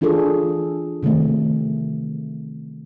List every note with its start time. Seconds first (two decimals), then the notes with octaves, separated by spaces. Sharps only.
0.01 E3 D4 F4 G#4 A4
1.03 C3 D#3 F3 A3 C4